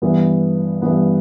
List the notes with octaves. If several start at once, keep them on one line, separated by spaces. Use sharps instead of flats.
G2 E3 B3
G2 E3 B3